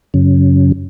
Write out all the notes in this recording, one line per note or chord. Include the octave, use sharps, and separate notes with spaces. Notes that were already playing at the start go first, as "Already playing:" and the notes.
F#2 C#3